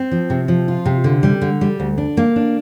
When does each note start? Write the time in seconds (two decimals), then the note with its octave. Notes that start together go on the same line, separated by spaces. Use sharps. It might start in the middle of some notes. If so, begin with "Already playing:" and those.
Already playing: C4
0.11 F3
0.30 C3
0.48 F3
0.68 F4
0.86 C3
1.04 D3
1.23 G3
1.41 D3
1.61 G3
1.80 D2
1.98 D4
2.17 A#3
2.36 D4